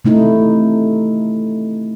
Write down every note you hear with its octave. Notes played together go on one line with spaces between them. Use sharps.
C3 A3 D#4 E4